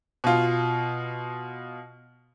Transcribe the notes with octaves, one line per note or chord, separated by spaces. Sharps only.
B2 F4